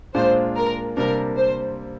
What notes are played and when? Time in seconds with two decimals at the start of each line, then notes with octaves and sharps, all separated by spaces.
0.14 A#2 G#3 D4 F4 C5
0.56 A#4
0.97 C3 G3 A#3 D4 A#4
1.37 C5